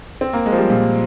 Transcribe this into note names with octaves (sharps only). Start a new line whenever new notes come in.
C4
A#3
G#3
F3
G3
A#2